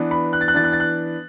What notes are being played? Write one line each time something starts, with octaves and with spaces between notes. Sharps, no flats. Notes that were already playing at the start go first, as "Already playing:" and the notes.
Already playing: E3 B3 D4
B5
F#6
A6
F#6
E3 B3 D4 A6
F#6
A6
F#6